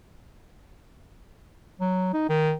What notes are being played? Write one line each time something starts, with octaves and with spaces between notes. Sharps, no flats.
F#3
D#4
D#3